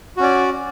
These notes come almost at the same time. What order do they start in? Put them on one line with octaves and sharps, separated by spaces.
F#4 C#4 D5